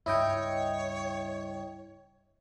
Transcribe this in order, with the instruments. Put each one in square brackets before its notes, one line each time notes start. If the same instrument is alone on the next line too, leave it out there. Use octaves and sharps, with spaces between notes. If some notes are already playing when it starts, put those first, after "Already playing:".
[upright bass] C#2 G2 [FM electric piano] E4 D#5 G5 [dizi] C#5